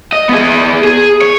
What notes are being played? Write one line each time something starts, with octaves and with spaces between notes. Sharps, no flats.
D#5
B3 G#4
G#4
C#5